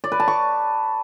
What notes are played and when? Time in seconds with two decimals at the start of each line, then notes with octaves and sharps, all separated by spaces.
0.04 D5
0.12 B4
0.20 A5
0.28 C#6